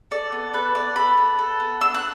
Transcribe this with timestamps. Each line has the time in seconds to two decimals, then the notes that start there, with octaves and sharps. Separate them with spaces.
0.11 A4 D5
0.32 B3
0.53 A4 B4
0.75 B3 D5
0.96 A4 B5
1.17 B3
1.39 A4
1.60 B3
1.81 D4 E6
1.94 F#6